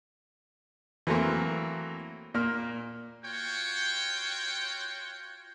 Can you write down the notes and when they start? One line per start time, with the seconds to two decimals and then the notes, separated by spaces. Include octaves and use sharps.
1.07 E3 F#3 A3 A#3 C4
2.34 A#2 A#3 F6
3.25 F4 F#4 C#5 G5